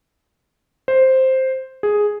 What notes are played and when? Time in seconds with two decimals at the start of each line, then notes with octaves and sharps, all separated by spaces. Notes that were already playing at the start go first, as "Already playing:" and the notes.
0.88 C5
1.83 G#4